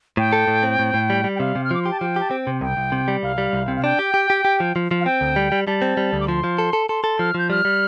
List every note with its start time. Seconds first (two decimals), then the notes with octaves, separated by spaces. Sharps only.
0.17 A2 G5
0.33 A4
0.48 A2
0.63 C4
0.79 A2
0.94 A2
1.10 G3
1.24 G3
1.36 G5
1.40 C3 F5
1.55 C3
1.64 F6
1.71 F3 D6
1.82 G4 C6
1.91 A5
2.00 F3 G5
2.16 G4 A5
2.31 C4 G5
2.47 C3
2.61 C2 G5
2.77 C2
2.92 C3
3.08 G3
3.23 C2 F5
3.38 G3
3.53 C2
3.68 C3
3.76 F5
3.84 D4 G5
3.99 G4
4.14 G4
4.30 G4
4.45 G4
4.60 F3
4.76 F3
4.91 F3
5.01 F5
5.05 C4 G5
5.21 D2
5.36 G3
5.52 G3
5.67 G3 A5
5.82 C4
5.97 G3
6.13 D2
6.20 D6
6.28 F3 C6
6.44 F3
6.58 A4
6.73 A4
6.89 A4 C6
7.04 A4
7.19 F3 F6
7.35 F3 G6
7.50 G3 F6
7.65 G3